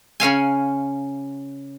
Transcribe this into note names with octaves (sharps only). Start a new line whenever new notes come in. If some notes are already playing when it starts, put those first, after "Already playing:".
C#3 C#4 F5 G#5